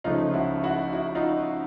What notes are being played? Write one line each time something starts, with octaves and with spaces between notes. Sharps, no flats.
C#2 C#3 F3 A3 D#4 F4
E4 F#4
E4 F#4
E4 F#4
D#4 F4